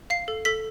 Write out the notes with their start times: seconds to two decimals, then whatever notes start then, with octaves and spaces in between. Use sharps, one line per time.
0.10 F5 C7
0.28 A4
0.45 A4 B6